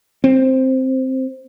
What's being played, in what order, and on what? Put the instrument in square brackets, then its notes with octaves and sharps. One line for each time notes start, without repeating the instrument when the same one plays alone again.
[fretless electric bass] C4